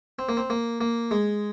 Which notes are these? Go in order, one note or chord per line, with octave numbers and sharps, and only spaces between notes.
C4
A#3
C4
A#3
A#3
G#3